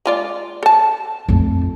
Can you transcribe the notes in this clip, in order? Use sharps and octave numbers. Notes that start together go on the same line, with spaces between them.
G#3 F4 D5
A4 A5
F2 A3